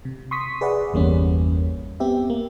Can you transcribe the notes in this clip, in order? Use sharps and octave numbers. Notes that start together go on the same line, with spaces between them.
C3
C6 C#6 D#6 B6
G#4 B4 D5 E5 F#5
G1 E2 G3 A#3 C#4
B3 C4 G4 E5
A#3